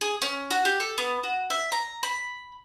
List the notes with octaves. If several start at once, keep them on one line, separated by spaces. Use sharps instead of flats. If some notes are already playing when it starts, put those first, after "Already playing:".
G#4
C#4
F#4
G4
A4
B3
F#4
E5
A#5
B5